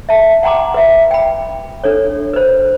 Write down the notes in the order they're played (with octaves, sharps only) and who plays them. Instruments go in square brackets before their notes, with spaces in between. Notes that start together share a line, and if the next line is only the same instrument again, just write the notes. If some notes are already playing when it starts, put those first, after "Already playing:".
[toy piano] E5 A5
F#5 G5 A#5 C6 D6
B4 E5
G5 B5
D4 A4 C#5
B4 C5